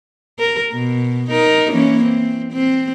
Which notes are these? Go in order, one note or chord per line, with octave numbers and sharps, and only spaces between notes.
A#4
B2
D#4 A#4
E3 A#3 C#4
C4
C4